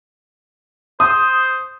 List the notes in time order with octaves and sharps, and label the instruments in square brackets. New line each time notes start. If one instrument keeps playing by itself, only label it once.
[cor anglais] C5 [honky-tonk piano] D#6